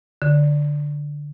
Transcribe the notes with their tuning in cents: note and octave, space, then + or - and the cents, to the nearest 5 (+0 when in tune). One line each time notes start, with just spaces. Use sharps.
D3 +0 C#5 +30